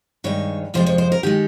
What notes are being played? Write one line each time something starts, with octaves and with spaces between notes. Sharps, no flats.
G2 D#3 G#3 C#5
F2 C3 F3 G#3 C5
C#5
C5
A#4
D#3 G#3 G4